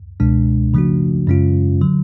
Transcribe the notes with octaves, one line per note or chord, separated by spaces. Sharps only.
C#2 B2 G#3 D4
C#3 F3 A3 D4 F#4
F#2 C#3 G#3 C#4 F4
D3 F#3